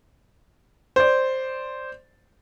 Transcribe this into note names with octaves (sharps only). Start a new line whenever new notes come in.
C5 D5